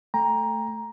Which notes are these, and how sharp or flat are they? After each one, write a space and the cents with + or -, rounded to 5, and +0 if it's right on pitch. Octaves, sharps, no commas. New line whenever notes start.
A3 +0 G5 +35 A#5 +10